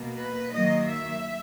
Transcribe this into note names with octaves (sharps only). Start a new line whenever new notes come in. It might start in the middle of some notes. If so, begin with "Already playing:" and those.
Already playing: B2 A#3
B4
D#3 F#3 A#3 D#5
E5